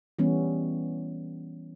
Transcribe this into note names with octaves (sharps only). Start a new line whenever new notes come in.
E3 G3 B3 C#4